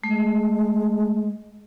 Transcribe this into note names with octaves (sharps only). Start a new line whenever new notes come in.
G#3 A3